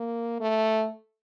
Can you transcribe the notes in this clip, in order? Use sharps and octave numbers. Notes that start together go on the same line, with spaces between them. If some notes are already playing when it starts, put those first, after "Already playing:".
Already playing: A#3
A3